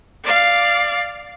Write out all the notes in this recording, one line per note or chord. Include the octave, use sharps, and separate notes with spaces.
D5 F5